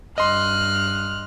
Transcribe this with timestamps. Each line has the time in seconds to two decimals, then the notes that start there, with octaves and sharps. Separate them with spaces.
0.18 G2 D#5 C6 F6 F#6